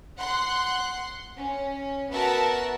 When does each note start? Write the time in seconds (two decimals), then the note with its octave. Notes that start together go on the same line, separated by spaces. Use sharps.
0.18 F#5 C6 F#6
1.37 C#4
2.13 B3 F#4 A#4 E5 F#5 A5